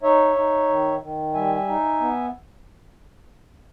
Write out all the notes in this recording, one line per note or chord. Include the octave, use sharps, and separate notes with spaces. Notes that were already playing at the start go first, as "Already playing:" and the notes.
D#4 C#5 E5
D#4
D#3
D#3
G3 E5 G#5
D#4
B3